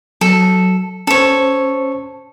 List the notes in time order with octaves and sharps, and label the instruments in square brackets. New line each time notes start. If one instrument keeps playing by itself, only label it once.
[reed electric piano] F#3 [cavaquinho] A4
[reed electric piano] C#4 C5 [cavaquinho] A4 C#5